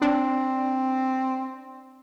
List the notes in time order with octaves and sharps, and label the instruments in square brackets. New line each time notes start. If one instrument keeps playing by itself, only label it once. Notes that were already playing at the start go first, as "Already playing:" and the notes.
[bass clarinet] C4 [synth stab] D4